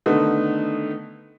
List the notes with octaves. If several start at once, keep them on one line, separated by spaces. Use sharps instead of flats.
D3 D#3 A3 B3 D#4